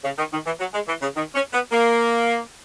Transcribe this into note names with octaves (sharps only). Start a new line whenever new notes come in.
C#3
D#3
D#3
E3
F#3
G#3
E3
C#3
D#3
C#4
B3
A#3